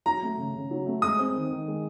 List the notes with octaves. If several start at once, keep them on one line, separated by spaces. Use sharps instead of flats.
F#3 A#5
A3
C#3
C#3
F#3
A3
G#3 D#6
C4
D#3
D#3
G#3